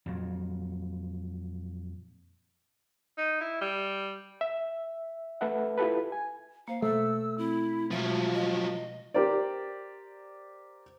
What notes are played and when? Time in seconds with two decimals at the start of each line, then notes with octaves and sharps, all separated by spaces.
0.06 F2 A#2 F#3
3.18 D#4
3.41 E4
3.61 G3
4.41 E5
5.41 A3 A4 B4 E5 F#5
5.78 E4 F4 G4 A4 B4
6.12 G#5
6.68 A#3 C5 F5
6.82 B2 A3 E6
7.38 C4 E4
7.91 B2 F3 F#3 G#3 E5
8.34 D#5
9.14 G4 A#4 C5 D5